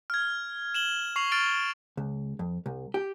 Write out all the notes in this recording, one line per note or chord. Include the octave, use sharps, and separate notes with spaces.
F6 G#6
E7 F#7 G7
C#6 C7 F7 F#7
F6 A6 D7 G7
C#2
F2
C2
G4